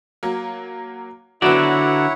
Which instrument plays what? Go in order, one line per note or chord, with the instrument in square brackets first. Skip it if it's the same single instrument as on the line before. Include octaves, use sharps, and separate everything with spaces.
[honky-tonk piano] F#3 A#3
[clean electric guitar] D3 F#4 D5 [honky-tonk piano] F#3 B3 [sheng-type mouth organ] E4 C#5 F#5